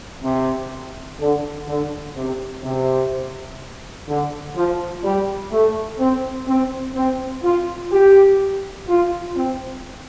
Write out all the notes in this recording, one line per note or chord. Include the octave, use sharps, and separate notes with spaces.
C3
D3
D3
C3
C3
D3
F3
G3
A3
C4
C4
C4
F4
G4
F4
C4